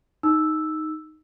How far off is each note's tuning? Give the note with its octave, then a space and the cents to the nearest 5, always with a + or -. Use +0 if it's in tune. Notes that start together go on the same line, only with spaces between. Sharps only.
D#4 +0 E6 +0